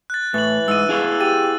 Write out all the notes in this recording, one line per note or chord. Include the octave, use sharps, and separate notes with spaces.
F#6 A6
A2 E3 A6 F#7
G#2 E6 D#7
E4 G#4 F5
G4 A6 D#7